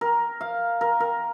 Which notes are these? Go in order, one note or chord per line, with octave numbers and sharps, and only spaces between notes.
A#4
F5
A#4
A#4